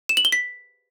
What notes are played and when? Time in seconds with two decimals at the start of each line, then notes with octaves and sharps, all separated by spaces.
0.09 E7
0.17 F#7
0.25 G7
0.32 B6